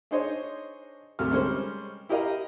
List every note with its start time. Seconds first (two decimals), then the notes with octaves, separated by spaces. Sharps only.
0.11 D4 D#4 G#4 C5 C#5 D#5
1.19 D2 C3 A3 F6
1.31 G3 G#3 C#4 A#4 C5
2.09 E4 G4 A#4 D#5 F5 A#5